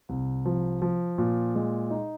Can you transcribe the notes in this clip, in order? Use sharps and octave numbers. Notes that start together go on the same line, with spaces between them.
C2
F3
F3
A#2
G#3
D#4